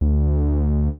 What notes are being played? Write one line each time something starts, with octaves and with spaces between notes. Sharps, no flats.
D2